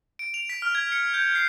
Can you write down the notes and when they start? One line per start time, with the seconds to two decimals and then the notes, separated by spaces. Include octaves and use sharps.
0.19 D7
0.34 F7
0.49 B6
0.62 F6
0.75 G#6
0.92 C#7
1.14 G6
1.35 C7